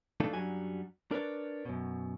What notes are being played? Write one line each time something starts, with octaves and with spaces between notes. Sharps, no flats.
E3 A3 D4 D#4 F4 A4
F#2 F#3 G3 D4 F#4 G#5
D4 A#4 B4 C#5 D5
F#2 B2